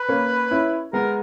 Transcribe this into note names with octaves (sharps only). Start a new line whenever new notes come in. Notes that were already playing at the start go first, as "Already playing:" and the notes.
Already playing: B4
A#3 C#4
C#4 E4
G#3 B3 A#4